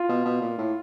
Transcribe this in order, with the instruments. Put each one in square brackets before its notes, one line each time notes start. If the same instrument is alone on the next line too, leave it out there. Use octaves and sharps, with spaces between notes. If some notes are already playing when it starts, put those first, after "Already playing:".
Already playing: [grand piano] F4
[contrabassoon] B2
B2
A#2
A2